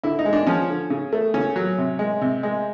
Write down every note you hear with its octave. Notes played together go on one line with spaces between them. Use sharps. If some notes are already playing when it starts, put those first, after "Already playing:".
D3 E4
D#4
G#3
D4
F3 C#4
D3
C#3
A3
C#3 C#4
F#3
C3
G#3
C3
G#3